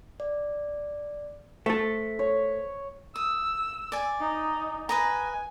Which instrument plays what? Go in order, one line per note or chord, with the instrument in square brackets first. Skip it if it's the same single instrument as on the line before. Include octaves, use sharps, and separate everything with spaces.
[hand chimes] D5
[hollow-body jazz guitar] A3 A4 [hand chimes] C5 B6
[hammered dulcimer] C#5
[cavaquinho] D#6 [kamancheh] E6
[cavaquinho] D5 G#5
[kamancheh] D#4
[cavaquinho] B4 D#5 A#5 [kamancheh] G#5